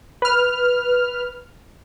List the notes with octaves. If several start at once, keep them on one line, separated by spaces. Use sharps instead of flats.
B4 F6